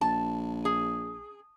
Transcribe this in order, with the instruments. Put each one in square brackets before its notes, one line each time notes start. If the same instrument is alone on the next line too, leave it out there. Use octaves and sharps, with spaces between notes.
[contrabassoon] A#1 [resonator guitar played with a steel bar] A5
[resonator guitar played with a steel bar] G#4